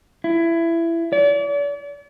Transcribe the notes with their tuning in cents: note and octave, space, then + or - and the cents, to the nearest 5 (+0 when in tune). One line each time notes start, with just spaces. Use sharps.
E4 +20
D5 -40